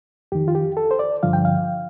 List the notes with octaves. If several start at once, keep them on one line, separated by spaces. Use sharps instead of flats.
F2 D#3 G4
F4
G4
A4
C5
D5
G2 D3 F3 F5
G5
F5